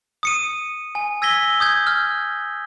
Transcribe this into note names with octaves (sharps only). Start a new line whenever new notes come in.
D#6 C#7 D#7
G#5
E6 G#6 A#6 B6 G7
D#6 G6 G#6
F6